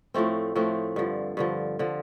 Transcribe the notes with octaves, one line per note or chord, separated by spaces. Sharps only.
A2 F3 A3 C4
A2 F3 A3 C4
G2 D3 F3
G2 D3 F3
D3 F3